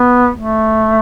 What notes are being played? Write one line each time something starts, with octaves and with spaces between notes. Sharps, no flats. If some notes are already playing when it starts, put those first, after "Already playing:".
Already playing: B3
A3